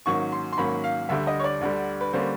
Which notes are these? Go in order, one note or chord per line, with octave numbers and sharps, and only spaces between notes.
G#2 D#3 F#3 A#3 C#4 C#6
C6
C6
G#2 D#3 F#3 A#3 C#4 B5
F5
D2 D3 G3 E5
D#5
C#5
D5
D2 D3 G3
B4
D3 G3 A#3 C#4 C5